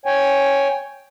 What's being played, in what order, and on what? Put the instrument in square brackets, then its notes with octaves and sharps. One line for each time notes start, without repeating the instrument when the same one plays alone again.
[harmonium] C#5 G5 G#5